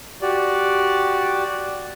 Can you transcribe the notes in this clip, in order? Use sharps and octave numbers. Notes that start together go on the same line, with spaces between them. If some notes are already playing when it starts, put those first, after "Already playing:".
F#4 G4 D5